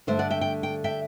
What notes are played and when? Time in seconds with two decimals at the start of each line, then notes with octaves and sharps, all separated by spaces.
0.07 G2 D3 A3 C5 E5
0.19 D5 F#5
0.30 E5 G5
0.41 G5
0.63 G5
0.84 E5 G5